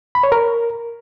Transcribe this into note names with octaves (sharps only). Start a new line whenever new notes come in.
B5
C#5
A#4